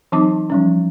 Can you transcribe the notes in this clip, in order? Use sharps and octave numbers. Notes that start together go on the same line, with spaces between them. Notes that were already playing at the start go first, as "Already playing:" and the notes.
E3 F#3 C4 D#4 A5 D6
F3 G3 C#4